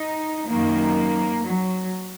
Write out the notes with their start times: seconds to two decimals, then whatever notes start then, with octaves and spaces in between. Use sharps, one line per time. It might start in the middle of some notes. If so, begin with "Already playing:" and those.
Already playing: D#4
0.48 F#2 D#3 A#3
1.44 F#3